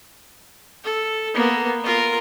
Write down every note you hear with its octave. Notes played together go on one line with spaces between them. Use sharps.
A4
A#3 B3
F4 A#4